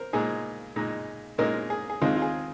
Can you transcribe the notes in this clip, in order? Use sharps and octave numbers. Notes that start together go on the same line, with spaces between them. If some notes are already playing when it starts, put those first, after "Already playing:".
Already playing: A#4 C5
A#2 G#3 D#4 G#4
A#2 G#3 D#4
A#2 G#3 D#4 A#4
G#4
G#4
D#2 D#3 G#3 C4 D#4 F4
F4
G#4